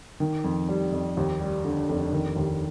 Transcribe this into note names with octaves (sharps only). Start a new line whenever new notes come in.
D#3
F2
G3
F2
D#2
G3
D3
F1
D#3
D#2